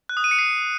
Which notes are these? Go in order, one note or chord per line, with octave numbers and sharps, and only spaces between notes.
F#6
D#6
D#7
C#7
C7